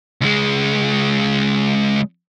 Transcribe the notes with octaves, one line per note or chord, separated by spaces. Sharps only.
C#2 G#3